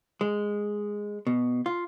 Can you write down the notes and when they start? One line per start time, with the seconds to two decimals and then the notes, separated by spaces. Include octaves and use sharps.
0.21 G#3
1.27 B2
1.66 F4